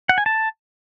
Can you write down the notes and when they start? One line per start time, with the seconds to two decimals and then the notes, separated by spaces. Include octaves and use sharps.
0.09 F#5
0.18 G#5
0.26 A5